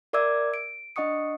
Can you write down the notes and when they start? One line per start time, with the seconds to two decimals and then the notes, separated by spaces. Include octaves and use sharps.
0.13 A#4 D5 E5 D6 E6 G#6
0.54 D7
0.96 D4 D#5 F#5 C#6 D#6 C#7